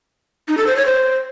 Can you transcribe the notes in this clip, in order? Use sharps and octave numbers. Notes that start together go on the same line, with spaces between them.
D#4
A4
C5
C#5
C5